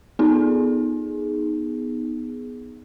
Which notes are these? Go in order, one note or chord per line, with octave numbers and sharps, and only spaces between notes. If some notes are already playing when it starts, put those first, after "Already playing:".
B3 D#4 G#4